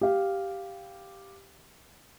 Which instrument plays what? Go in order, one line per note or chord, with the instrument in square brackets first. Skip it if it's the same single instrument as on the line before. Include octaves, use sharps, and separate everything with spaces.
[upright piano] G4 F5